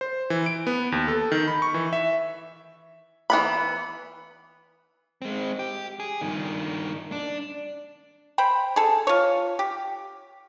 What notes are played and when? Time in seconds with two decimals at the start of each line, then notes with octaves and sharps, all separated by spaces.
0.01 C5
0.30 E3
0.46 D7
0.67 B3
0.92 D#2
1.08 A4
1.32 D#3
1.48 B5
1.62 C#6
1.74 E3
1.93 E5
3.30 E3 B3 B5
5.22 G#3 C4
5.59 G4
6.00 G#4
6.21 G2 D#3
7.12 D4
8.38 C5 G5 B5
8.76 G#4 A4
9.07 F4 C#5
9.59 G4